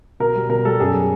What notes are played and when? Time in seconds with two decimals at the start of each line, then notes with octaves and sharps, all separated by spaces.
0.20 B2 A#4
0.35 G3
0.49 B2 A#4
0.65 G3 A4
0.80 F#2 G#4